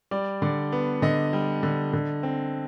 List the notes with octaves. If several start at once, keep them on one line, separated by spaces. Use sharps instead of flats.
G3 D5
D3 D5
B3
D3 D#5
G3
D3
D3
C4